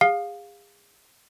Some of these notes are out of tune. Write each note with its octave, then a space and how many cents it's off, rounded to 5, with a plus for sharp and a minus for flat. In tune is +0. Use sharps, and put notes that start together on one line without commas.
G#4 -35 F5 +15